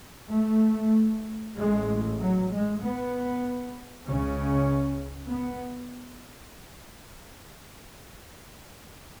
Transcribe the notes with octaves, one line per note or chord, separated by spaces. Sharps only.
A3
A1 A2 G#3
F#3
G#3
B3
C#2 C#3 C#4
B3